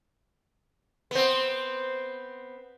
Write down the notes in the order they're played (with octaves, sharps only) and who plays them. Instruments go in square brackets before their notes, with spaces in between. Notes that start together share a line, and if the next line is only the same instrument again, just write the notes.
[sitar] B3 C4